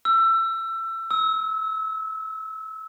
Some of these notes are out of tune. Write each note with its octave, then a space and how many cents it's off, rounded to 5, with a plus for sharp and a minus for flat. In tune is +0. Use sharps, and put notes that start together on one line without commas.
E6 +25
E6 -30